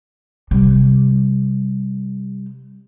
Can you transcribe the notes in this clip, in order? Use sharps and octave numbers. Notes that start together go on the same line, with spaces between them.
C3 G3